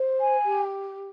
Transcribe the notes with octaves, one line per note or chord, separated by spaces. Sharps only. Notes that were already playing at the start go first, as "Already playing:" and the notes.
Already playing: C5
G#5
G4